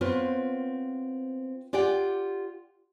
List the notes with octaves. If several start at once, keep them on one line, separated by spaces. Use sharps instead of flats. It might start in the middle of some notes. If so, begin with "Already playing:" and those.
B3 C4 F4 C#5
F4 G4 D5 F#5 G5